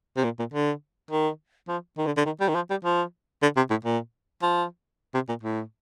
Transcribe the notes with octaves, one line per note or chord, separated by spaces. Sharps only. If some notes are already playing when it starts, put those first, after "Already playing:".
C3
A#2
A#2
D3
D#3
F3
D#3
D3
D3
D#3
G3
D#3
F3
G3
F3
D3
C3
A2
A#2
F3
C3
A#2
A2